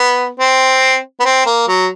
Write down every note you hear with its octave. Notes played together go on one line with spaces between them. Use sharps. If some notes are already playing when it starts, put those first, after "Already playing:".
Already playing: B3
C4
B3
C4
A#3
F#3